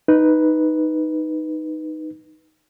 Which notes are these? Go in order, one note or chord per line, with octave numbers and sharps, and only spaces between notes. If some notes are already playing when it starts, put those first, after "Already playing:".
D#4 B4